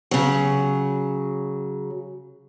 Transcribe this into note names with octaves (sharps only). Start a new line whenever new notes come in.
C#3 F#3